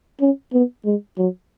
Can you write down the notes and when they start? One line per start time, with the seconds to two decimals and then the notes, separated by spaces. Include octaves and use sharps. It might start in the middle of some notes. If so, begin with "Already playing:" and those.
0.21 C#4
0.53 B3
0.85 G#3
1.18 F#3